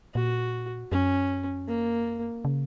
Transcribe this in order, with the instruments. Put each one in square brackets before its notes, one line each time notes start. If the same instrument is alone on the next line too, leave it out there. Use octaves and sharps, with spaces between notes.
[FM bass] A#2 [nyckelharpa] F#4
[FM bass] F#2 [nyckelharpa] C#4
[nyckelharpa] A#3
[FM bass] C#3